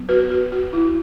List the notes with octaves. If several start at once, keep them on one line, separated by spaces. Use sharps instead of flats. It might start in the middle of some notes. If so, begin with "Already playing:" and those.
Already playing: F#3 B3
F#4 B4
F#4
F#4
E4